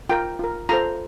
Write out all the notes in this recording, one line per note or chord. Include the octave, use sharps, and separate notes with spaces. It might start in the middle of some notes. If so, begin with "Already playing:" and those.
F4 A#4 G5
F4 A#4
F4 A4 C5 A#5